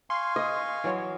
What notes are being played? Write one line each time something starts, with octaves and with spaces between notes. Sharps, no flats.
F5 G#5 C6 C#6
D#5
E3 F#3 C#5